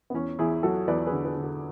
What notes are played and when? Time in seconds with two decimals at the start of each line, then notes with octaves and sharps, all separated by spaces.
0.10 B3
0.14 E2 C#4
0.39 E2 E4 G#4
0.63 F#3 F#4 A4
0.88 E2 B4 D5
1.06 G#4 B4
1.12 D3
1.25 G#4 B4
1.37 D3
1.43 F#4 A4